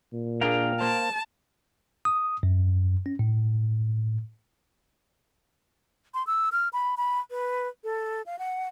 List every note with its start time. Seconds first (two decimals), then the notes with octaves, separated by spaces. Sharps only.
0.13 A#2
0.41 A#3 D4 G#4 F5 G5 A#5
0.81 A#3 C5 A5
2.05 D#6
2.43 F#2
3.06 C#4
3.19 A2
6.14 C6
6.27 E6
6.52 F6
6.73 B5
6.97 B5
7.31 B4
7.84 A4
8.26 F5
8.39 F#5